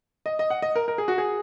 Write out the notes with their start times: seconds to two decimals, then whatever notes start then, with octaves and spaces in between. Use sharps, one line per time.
0.26 D#5
0.39 D#5
0.50 F#5
0.62 D#5
0.75 A#4
0.88 A#4
0.98 G#4
1.08 F#4
1.18 G#4